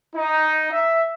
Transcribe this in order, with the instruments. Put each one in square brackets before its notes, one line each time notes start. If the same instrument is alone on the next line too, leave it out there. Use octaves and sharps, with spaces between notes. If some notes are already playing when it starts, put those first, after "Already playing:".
[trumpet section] D#4
E5